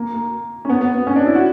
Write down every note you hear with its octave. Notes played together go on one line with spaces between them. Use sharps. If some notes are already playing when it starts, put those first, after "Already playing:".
Already playing: A#3
A#3
C#4
B3
B3
B3
C#4
D4
E4
F#4